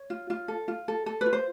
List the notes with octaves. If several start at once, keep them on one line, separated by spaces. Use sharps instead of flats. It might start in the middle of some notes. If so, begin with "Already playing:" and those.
Already playing: C#5
F4
F4
A4
F4
A4
A4
F4 B4
C5